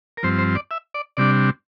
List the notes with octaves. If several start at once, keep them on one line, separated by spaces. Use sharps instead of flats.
A#4
G2 F3 C4 C5
C5
D5
E5
D5
C3 G3 D4 D5